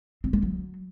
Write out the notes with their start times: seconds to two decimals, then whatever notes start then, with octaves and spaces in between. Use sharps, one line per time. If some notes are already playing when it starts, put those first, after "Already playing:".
0.24 C4
0.33 A#3
0.43 F#3